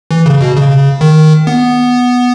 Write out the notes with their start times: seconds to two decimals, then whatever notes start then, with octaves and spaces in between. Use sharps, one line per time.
0.11 E3
0.26 C#3
0.41 B2
0.56 C#3
1.01 D#3
1.47 B3